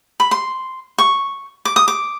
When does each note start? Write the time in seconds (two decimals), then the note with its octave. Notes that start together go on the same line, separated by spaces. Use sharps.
0.20 B5
0.31 C6
0.98 C#6
1.65 D6
1.76 D#6
1.88 D6